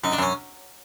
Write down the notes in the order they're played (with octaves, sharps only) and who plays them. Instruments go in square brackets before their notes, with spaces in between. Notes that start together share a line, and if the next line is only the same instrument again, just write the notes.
[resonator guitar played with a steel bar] F#2 [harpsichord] D#4
[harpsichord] D4
[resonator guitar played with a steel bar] F#2 [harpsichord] C#4